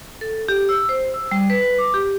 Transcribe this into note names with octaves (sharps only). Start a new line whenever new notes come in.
A4
G4
E6
C5
E6
G3
B4
D6
G4